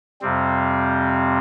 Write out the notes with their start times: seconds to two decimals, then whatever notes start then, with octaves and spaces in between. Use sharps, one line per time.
0.21 F2 C3 G3 C4